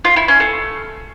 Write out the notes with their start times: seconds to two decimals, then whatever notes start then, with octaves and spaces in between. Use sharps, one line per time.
0.05 F4
0.16 E4
0.28 C#4
0.40 A3